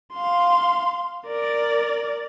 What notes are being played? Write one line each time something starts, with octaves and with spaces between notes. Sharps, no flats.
F5 C6
A#4 D5